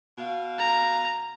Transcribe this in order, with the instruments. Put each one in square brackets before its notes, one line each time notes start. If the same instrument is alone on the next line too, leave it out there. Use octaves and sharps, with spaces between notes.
[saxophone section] B2 F5
[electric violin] A#5